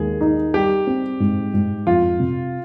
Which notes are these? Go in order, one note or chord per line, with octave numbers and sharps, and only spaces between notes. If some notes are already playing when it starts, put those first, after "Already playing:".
Already playing: D#2 G#3 G#4
D#4
G3 G4
C4
G#2
G#2
F2 F4
C3